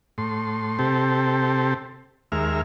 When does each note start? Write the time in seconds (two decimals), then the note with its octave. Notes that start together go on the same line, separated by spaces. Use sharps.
0.18 A2 C6
0.79 C3 C4 G4 A4
2.32 D#2 G#3 A#4 E5 F6